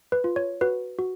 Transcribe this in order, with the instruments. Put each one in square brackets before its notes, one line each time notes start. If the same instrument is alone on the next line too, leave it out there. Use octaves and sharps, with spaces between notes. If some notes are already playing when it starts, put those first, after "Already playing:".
[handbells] B4
F4
C#5
F#4 B4
F#4